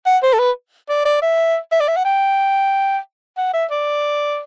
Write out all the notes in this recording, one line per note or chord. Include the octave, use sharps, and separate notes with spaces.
F#5
C5
A4
B4
D5
D5
E5
E5
D5
E5
F#5
G5
F#5
E5
D5